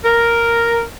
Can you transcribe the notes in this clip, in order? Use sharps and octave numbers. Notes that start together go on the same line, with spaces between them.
A#4